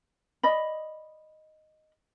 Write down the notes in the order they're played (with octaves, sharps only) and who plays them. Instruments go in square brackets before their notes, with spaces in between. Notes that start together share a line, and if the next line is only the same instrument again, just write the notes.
[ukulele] D5 D#5 B5